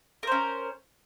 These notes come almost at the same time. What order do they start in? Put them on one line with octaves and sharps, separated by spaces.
A#4 C5 C#4